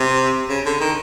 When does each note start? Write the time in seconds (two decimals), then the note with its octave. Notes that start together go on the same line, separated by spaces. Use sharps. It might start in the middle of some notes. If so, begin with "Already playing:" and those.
Already playing: C3
0.49 C#3
0.66 D3
0.81 D#3